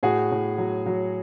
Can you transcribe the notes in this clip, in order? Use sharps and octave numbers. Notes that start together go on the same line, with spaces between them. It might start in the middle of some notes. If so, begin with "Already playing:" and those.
A2 F#4 G#4
A2
F#3
F#3